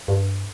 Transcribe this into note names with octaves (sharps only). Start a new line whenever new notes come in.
G2